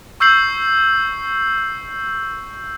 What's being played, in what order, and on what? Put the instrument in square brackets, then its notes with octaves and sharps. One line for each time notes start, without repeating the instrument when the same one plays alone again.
[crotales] C#6 E6 G6 C7 F#7